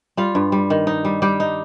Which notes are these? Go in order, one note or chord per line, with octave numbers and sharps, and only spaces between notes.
G3 F4 F5
G2
G3
D#3
D#4
G3
G3 G4 G5
D#4